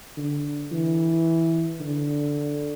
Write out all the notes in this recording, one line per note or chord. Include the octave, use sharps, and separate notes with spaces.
D3
E3
D3